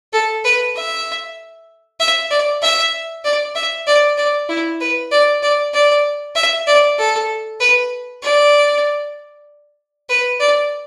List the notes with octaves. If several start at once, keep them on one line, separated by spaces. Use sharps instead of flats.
A4
B4
E5
E5
D5
E5
D5
E5
D5
D5
E4
B4
D5
D5
D5
E5
D5
A4
B4
D5
B4
D5